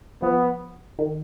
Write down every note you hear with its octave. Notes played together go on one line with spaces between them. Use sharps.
F3 B3
D#3